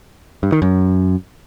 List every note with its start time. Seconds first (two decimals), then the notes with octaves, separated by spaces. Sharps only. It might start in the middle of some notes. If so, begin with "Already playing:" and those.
0.43 G2
0.52 D#3
0.62 F#2